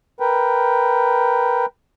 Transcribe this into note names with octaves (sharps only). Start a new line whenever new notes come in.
A#4 B4 G5